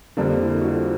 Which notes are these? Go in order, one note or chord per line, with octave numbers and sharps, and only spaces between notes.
F2 D3 G3 A#3 D4
E4
F#4
F4